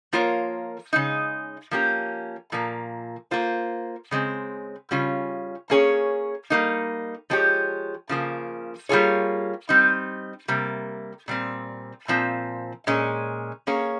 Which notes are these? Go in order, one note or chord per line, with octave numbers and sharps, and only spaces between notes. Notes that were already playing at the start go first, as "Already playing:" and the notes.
F3 A#3 F4 A#4 C#5
C#3 G#3 D#4
F3 A#3 C#4 G4
A#2 F3 A#3
A#3 F4 C5
C#3 G#3 C4
C#3 G3 C#4 F4
A#3 C#4 G#4 C#5
G3 A#3 D#4
F3 G#3 C4 G4 C#5
C#3 F3 A#3
G3 A#3 F4 G#4 C#5
G3 C4 D#4
C3 G3 A#3
A#2 G3 C4
A#2 F3 C4
A#2 G#3 C#4
A#3 C#4 G#4 C#5